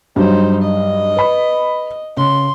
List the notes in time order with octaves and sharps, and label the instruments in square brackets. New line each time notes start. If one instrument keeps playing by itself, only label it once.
[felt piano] G2 F#3 G3 [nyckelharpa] D#4 C5
[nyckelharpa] D#5
[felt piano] B4 B5
[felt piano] C#3 [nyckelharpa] C6